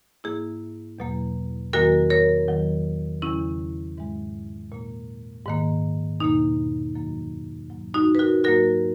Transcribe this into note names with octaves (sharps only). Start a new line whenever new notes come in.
G#2 E3 A#3 E4 G#4
E2 B2 F#3 A#3
E2 D#3 F#3 A#3 F#4 A#4
A#4 C#5
E2 D#3 F#3
E2 C#3 F#3 C#4 E4
G#2 E3 G#3
A#2 A#3
G#2 D#3 A#3
E2 B2 A#3 D#4
F#2 D#3 F#3 A#3
G#2 F#3 A#3
D#4 F#4
B4
F#4 A#4
G#2 F#3 A#3 F#4 A#4